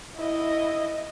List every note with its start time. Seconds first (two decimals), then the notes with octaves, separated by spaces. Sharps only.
0.16 E4 D#5